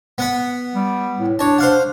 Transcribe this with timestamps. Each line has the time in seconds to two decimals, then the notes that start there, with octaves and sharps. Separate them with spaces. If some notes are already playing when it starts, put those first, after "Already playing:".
0.18 B3 F#5 B5
0.75 G3
1.19 A2
1.39 D4 C#5 A5
1.58 C5 F5 F#5